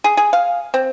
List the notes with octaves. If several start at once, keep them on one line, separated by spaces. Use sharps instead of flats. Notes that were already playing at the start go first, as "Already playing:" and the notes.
G#4
G#4
F5
C4